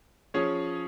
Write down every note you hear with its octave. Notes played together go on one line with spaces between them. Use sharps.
F3 C#4 G#4 C#5